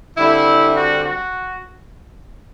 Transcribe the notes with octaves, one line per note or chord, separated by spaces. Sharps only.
D3 G3 C4 E4
F#4
F#4